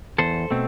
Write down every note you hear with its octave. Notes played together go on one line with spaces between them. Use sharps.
E2 A4 C5
B2 A3 C4